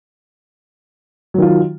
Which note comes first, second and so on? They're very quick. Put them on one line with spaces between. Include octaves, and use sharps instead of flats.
F#3 D#3 F4